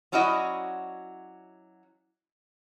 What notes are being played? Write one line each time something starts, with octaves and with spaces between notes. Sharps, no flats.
F#3 C#4 E4 F#4 D5 D#5